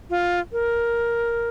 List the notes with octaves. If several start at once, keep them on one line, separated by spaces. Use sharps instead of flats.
F4
A#4